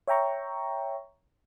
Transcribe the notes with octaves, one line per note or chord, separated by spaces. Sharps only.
C#5 E5 G5 A#5 C#6